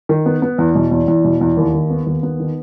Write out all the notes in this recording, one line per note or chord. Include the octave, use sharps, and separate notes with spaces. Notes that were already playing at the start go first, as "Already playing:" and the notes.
D#3
B3
B3
E2
B2
E2
E2
B2
E2
D#2
D#3
B3
D#2
B3
D#3